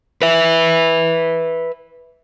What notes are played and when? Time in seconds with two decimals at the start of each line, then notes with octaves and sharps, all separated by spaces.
0.22 B4 E5